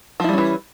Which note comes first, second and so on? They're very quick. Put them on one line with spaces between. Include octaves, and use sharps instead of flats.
F3 E4 G3 C#4 E3